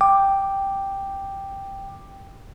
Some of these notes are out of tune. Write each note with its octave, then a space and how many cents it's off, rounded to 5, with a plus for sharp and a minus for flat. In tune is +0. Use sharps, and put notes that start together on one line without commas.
G5 +0 D6 +5